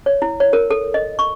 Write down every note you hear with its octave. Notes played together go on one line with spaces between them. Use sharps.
C#5
E4
C#5
A#4
A4
D#5
C#6